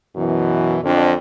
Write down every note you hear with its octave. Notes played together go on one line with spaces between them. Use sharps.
F#2 B2 E3
F2 D3